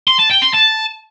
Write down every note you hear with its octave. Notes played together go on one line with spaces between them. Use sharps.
C6
A5
G5
C6
A5